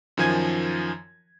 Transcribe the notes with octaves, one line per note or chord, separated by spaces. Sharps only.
F#2 D#3 F3 G#5 G#6